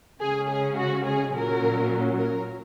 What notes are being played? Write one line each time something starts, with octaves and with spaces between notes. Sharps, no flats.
C#3 G#3 C#4 G#4
G#4
F#4
G#4
A#2 F#3 C#4 A#4
A#4